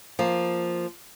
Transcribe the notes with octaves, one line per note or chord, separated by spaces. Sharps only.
F3 A#3